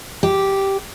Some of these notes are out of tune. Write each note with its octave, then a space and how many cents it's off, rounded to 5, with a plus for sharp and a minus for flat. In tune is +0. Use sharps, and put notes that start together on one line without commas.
G4 -5